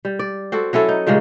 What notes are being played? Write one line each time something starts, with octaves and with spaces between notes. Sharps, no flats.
G3
D5
C4 F#4 A4
F#3 C#4 E4 A4
D#4
A#2 C#3 G3 G#3